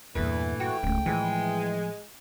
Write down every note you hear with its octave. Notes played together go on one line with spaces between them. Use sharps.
E2 G2 A#2 E3 A3 B4
F#4 G5
D1 C#2 A3
A2 E3 F3 G#3